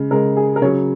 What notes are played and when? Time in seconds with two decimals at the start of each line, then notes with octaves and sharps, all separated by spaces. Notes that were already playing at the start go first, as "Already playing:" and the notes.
Already playing: C#3 G#3
0.11 C#3 G#3 A#4
0.37 G#4
0.56 A#4
0.62 C#3 C#5
0.65 F#3